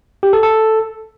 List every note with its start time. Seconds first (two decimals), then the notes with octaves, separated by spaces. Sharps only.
0.23 G4
0.33 A4
0.43 A4